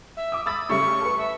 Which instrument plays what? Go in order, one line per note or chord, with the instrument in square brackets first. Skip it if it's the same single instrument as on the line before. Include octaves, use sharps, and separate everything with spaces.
[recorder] E5
[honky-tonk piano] D6 D#6
[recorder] B5 [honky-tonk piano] D#6 E6 A6
[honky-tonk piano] C#3 G3 A3 [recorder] C#6
[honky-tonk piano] A4 B4
[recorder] E5